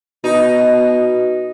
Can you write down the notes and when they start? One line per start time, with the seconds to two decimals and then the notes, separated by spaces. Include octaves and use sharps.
0.24 B2 D#4